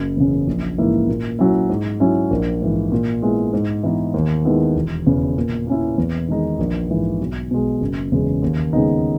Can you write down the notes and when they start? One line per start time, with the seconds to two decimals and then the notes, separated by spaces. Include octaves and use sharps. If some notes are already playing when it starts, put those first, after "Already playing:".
Already playing: F#1
0.17 E2 C#3
0.47 A#1
0.78 G#2 E3 A#3 E4
1.08 A#2
1.39 F#3 C#4 E4
1.69 G#2
2.00 F#3 C#4 E4
2.31 A#1
2.61 G#2 E3
2.92 A#2
3.22 G#3 B3 E4
3.53 G#2
3.83 E3 B3 D#4
4.14 D#2
4.45 D#3 G#3 B3 E4
4.75 E1
5.06 E2 C#3
5.37 A#2
5.67 A#3 C#4 E4
5.98 E2
6.28 D#3 G#3 D#4
6.59 A#1
6.90 G#2 E3
7.20 B1
7.51 B2 G#3
7.81 F#1
8.12 E2 C#3 G#3
8.42 D#2
8.73 C#3 G#3 B3 D#4